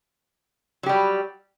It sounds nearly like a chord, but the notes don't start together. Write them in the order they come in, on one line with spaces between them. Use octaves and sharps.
F#3 G4 G3